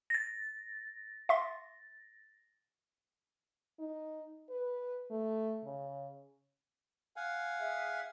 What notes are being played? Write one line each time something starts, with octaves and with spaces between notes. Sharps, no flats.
A6 A#6
E5 C6
D#4
B4
A3
C#3
F5 F#5 G#5
G#4 E5